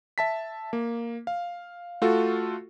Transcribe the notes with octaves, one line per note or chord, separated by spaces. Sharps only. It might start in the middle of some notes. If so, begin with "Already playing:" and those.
E5 A5 B6
A#3
F5
A3 F4 F#4 A4